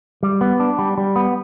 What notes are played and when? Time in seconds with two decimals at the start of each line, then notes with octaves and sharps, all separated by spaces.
0.23 G3
0.41 B3
0.60 D4
0.79 G3
0.98 G3
1.16 B3